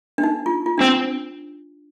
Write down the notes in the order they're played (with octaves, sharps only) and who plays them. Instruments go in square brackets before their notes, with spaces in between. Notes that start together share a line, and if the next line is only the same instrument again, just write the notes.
[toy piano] D4
D#4
F4
F4
[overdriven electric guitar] C4 [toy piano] D4